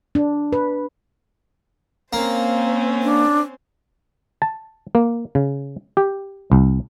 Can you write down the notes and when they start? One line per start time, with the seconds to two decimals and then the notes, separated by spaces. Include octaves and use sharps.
0.15 D4
0.53 B4
2.13 A#3 C4 C#4 C5
3.03 D4
4.42 A5
4.95 A#3
5.35 C#3
5.97 G4
6.52 C2